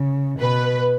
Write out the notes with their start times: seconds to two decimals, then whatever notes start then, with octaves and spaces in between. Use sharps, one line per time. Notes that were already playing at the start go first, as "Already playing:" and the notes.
Already playing: C#3
0.39 B2 B4